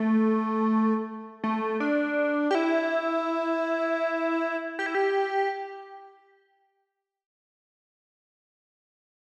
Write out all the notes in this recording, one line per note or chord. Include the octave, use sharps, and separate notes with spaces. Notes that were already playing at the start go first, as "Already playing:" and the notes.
Already playing: A3
A3
D4
G4
E4
G4
E4
G4